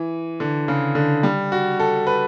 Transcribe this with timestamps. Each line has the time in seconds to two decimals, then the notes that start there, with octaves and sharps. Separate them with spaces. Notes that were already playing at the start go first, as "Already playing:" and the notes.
Already playing: E3
0.40 D3
0.68 C#3
0.95 D3
1.23 G3
1.52 F#4
1.80 A4
2.07 B4